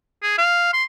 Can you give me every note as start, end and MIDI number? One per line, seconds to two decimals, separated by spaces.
0.22 0.36 68
0.38 0.70 77
0.73 0.84 84